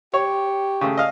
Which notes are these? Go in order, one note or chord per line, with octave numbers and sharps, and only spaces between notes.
G4 C#5
C#3 A3
D#5 F5